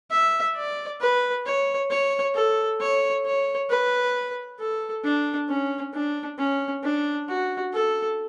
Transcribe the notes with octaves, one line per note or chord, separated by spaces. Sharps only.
E5
D5
B4
C#5
C#5
A4
C#5
C#5
B4
A4
D4
C#4
D4
C#4
D4
F#4
A4